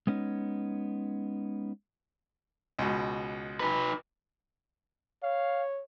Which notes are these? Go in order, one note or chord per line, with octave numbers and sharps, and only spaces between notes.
G#3 B3 C#4 D#4
C#2 B2
D#4 B4
C#5 F5